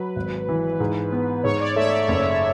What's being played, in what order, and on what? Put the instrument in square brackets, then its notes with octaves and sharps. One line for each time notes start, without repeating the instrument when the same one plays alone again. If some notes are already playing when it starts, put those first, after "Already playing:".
Already playing: [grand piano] F#3 [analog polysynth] B4
[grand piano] G#1
E3
G#2
B3
[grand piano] G#2 [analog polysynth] C#5
[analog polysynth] D5
[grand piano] A3 [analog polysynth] E5
[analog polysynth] D5
[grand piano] F#1 [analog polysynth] C#5